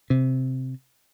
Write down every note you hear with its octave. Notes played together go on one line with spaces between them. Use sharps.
C3